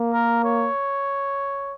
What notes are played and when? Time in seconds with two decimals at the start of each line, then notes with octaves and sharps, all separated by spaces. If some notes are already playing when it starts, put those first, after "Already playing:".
Already playing: A#3
0.13 A#4
0.44 C#5